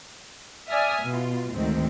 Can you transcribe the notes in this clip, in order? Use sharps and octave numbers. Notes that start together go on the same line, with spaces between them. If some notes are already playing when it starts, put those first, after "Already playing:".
D5 E5 G#5 D#6 F6
B2 F4
D2 G#2 D#3 C4